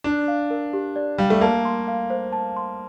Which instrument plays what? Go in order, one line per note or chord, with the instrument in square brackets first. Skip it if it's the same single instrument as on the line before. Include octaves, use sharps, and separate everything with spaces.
[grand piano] D4 [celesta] D5
[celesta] F5
A#4
G4
D5
[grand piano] G3 [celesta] F5
[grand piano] A3
[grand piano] A#3 [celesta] A5
[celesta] C6
F5
C5
A5
C6